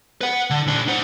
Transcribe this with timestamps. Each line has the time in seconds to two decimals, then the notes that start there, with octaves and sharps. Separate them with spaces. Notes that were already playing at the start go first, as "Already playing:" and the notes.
0.21 B4 F#5
0.50 D3
0.67 A#2 D4
0.88 C5 F#5